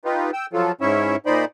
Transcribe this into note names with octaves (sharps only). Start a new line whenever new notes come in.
D#4 F4 G4 B4
G5 E6
F3 F#3 F4 A4
G#2 C#4 E4 C#5 E5
A#2 D#4 C5 D5 D#5 B5